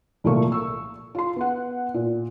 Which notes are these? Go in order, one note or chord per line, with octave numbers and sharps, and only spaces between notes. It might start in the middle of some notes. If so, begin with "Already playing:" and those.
C2 A#2 F3 A3 A#3 C#6
C#6 E6
F4 C6
B3 F#5
A#2